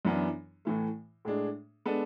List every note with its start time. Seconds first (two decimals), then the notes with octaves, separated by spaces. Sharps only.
0.05 F#2 E3 B3 D4
0.65 A2 E3 A3
1.25 A2 G#3 D4 G#4
1.86 G#3 B3 D4 A4